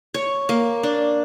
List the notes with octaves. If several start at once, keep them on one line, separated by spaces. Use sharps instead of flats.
C#5
A#3
D4